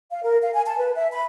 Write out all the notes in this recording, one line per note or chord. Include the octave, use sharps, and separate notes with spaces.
F5
A#4
F5
G#5
A5
B4
E5
B5